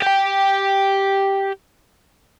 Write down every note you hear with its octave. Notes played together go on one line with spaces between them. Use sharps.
G4 G5